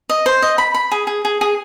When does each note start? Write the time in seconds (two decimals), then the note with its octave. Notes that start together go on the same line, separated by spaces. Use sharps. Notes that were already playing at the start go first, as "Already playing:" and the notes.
0.10 D#5
0.26 C5
0.42 D#5
0.58 B5
0.74 B5
0.92 G#4
1.07 G#4
1.25 G#4
1.41 G#4